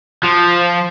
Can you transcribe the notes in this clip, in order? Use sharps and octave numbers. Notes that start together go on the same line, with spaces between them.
F3